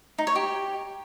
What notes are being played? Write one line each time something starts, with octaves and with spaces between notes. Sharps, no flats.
D#4
C#5
G4